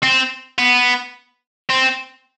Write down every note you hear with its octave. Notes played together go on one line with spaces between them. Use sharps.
C4
B3
C4